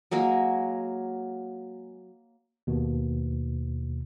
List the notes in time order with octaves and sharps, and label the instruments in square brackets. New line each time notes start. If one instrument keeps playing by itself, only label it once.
[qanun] F#3 G#3 A#3 F#4
[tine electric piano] D#2 B2